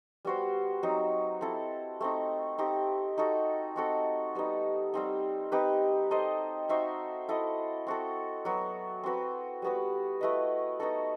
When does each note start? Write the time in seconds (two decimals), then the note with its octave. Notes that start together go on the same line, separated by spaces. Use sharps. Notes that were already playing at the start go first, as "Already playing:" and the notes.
0.25 G3 B3 F#4 C5
0.83 F#3 C4 D#4
1.41 C4 E4 A4
2.01 A3 C4 D#4
2.58 C4 D#4 G4
3.18 D#4 F#4 A4
3.76 C4 F#4 A4
4.35 G3 B3 D#4
4.94 G3 C4 D#4
5.52 C4 D#4 G4 B4
6.11 D#4 A4 C5 D#5
6.69 D#4 F#4 C5 E5
7.29 E4 A4 D#5
7.87 C4 F#4 A4
8.45 F#3 B3 F#4
9.03 C4 F#4 B4
9.62 G3 B3 F#4 B4
10.21 A3 E4 B4 D#5
10.80 B3 D#4 F#4 A4